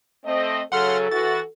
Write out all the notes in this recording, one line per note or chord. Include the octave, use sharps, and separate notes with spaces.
A3 C4 D#5
C#3 F#3 A4 F#5 C6 F6
E3 F#4 A6